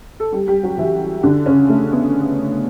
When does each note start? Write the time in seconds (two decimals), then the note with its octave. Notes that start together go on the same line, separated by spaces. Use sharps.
0.20 A4
0.32 G3 G4
0.47 G3 G4
0.63 F#3 F#4
0.78 E3 E4
1.23 D3 D4
1.46 C#3 C#4
1.69 A3
1.93 B3